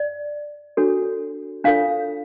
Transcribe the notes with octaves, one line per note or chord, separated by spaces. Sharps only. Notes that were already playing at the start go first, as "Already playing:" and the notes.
Already playing: D5
D4 F#4 A4 C#5
D4 F4 A4 C#5 F5